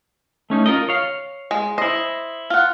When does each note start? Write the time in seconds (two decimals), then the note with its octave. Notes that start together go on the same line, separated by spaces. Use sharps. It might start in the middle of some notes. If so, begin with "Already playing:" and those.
0.50 A3 C#4 D#4
0.66 F4 A#4 D#5
0.89 C#5 F5
1.51 G#3
1.78 E4 C5 D#5
2.50 F4 F#5